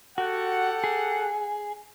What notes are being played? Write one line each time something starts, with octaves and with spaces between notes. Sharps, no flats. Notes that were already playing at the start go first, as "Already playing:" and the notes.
F#4 G4 A4 F#5
G#4